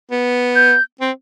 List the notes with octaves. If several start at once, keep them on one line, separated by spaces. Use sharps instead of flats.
B3
G6
C4